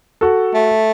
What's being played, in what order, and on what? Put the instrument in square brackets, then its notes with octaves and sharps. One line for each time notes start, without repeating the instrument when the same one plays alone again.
[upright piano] F#4 A4
[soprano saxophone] A3